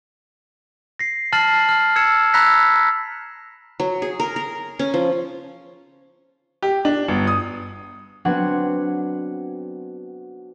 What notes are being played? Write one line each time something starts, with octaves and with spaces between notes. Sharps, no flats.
A#6 C7
A5 F6 A6 C7 F#7
F6
E6 G#6 C#7 E7
A#5 B5 E6 F#6 A#6 B6
F#3
G#4
A#4
A#4
C#4
F3
G4
D4
G1
D#6
F#3 B3 C4 D4 F#5 G#6